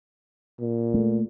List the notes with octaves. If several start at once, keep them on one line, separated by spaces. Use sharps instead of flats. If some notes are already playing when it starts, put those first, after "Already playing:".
A#2
A3